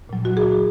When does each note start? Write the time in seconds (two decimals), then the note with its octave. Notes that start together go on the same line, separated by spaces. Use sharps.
0.09 A#2 F#3
0.25 F#4
0.37 G#4